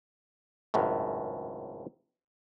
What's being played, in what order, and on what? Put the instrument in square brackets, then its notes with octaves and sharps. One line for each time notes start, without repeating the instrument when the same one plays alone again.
[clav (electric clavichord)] G#1 C#2 F#2 A2